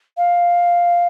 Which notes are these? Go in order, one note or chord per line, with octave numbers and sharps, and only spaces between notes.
F5